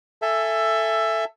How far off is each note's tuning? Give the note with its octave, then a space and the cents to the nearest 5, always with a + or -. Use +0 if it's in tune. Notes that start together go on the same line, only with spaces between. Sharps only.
A4 +10 E5 +15 G#5 +0